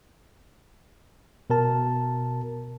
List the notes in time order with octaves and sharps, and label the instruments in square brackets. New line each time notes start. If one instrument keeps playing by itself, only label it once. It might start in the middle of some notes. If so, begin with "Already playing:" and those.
[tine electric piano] B2 A#4 A5